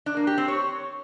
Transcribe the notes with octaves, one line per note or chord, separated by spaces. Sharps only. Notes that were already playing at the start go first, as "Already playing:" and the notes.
D4
A#3
G4
C4
C#5